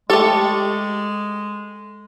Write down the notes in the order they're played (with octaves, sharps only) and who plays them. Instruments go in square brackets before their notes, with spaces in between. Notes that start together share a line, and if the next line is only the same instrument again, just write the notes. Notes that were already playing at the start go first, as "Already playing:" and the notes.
[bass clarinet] G#3 [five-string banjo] A3 A4 [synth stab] G4 C#6 A6